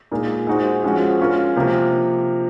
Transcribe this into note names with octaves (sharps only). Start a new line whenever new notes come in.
A#2 G#3 D#4 A#4
G#3 D#4 F#4 C5
F3 G#3 C#4 F#4
G#3 C#4 F4 A#4
C3 F3 A#3 F4 A#4